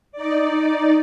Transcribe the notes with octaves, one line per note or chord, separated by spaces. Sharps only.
D#4 D5